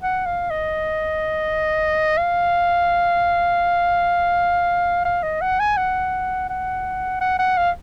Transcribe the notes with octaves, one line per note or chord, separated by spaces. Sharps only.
F#5
F5
D#5
F5
F5
D#5
F#5
G#5
F#5
F#5
F#5
F#5
F5